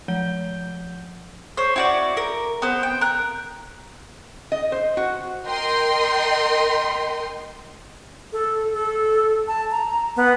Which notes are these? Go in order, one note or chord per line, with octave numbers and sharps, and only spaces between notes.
F3 F#5 G6 G7
C5 C#5
E4 F#4 D5
A#4
B3 C5
G5
A#4 F#6
D#5
C5
F#4
A#4 D#5 G5 C6
A4
A4
A5
A#5
B3